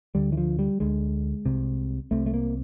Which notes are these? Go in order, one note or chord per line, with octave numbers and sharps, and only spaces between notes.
D2 D3 G3
E3
F3
G3
D2 D3 G#3
C2 C3
C2 C3 A3
A3
A#3